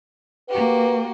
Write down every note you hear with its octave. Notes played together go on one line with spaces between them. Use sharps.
A#3 F#4 G4 B4